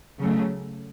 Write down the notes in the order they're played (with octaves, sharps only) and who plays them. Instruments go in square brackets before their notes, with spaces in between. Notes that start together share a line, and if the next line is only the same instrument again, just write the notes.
[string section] C#3 F#3 A3